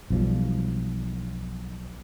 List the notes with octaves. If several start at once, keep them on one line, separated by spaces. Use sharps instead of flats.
B1 F3 G3